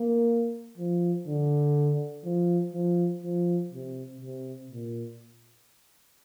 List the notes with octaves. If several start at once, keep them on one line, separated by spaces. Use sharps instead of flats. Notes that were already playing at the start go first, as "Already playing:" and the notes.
Already playing: A#3
F3
D3
F3
F3
F3
C3
C3
A#2